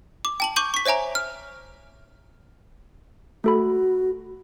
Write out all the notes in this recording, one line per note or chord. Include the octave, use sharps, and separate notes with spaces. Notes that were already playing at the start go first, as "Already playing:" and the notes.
D6
G5 A5 F#7
C#6 D6 G6 D#7 F#7
C#6 B6
C5 C#5 E5 G#5 A#5
F6
A3 F#4 A4 B5